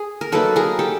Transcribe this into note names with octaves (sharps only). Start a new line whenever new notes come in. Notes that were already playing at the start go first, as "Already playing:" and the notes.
Already playing: G#4
A#4
F#3 A#3 D#4 A4 B4
G#4 A#4
G4 A4